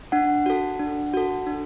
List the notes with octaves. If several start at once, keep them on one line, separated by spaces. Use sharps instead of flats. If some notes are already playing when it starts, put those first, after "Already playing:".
D4 F#5
F#4 A4
D4
F#4 A4
D4